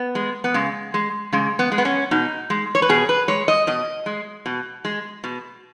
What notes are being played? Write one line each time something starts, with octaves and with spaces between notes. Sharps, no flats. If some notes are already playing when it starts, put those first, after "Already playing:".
Already playing: B3
G#3
B3
C#3 G#3
G#3
C#3 G#3
B3
G#3
B3
C#4
B2 D#4
G#3
C#5
B4
B2 G#4
B4
G#3 C#5
D#5
B2 D#5
G#3
B2
G#3
B2